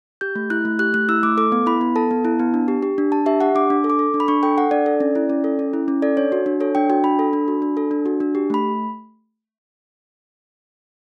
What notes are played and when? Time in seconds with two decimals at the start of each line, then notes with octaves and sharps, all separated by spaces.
0.21 G4 G6
0.35 A3
0.50 E4 F#6
0.65 A3
0.79 G4 F#6
0.94 A3 F#6
1.09 E4 E6
1.23 A3 D6
1.37 A4 D6
1.52 B3
1.66 E4 B5
1.81 B3
1.96 A4 A5
2.11 B3
2.25 E4
2.39 B3
2.54 D4
2.68 G4
2.83 G4
2.98 D4
3.12 D4 A5
3.26 G4 E5
3.40 G4 F#5
3.55 D4 D6
3.70 D4
3.84 A4
3.90 D6
3.99 A4
4.14 D4
4.20 B5
4.28 D4 C#6
4.43 A4 G5
4.58 A4 F#5
4.71 D4 D5
4.86 A4
5.00 C#4
5.15 E4
5.30 C#4
5.44 A4
5.59 C#4
5.73 E4
5.88 C#4
6.02 A4 D5
6.17 D4 C#5
6.32 F#4
6.46 D4
6.60 A4 C#5
6.75 D4 G5
6.90 F#4 G5
7.04 D4 B5
7.19 A4
7.33 D4
7.48 F#4
7.62 D4
7.77 A4
7.91 D4
8.06 F#4
8.20 D4
8.35 G4
8.50 A3 B5